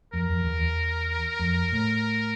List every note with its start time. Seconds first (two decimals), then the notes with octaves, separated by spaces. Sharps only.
0.13 F2 A#4
0.29 F2
0.44 E2
0.60 E2
1.39 F2
1.72 A2